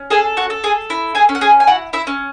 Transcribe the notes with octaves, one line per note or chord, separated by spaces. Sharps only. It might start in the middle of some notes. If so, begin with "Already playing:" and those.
Already playing: C#4
G#4 A4 G#5
F#4 F#5
A4
G#4 G#5
E4
G#4 G#5
C#4
F#5
G#4 G#5
G#5
E4 F#4 F#5
E4 E5
C#4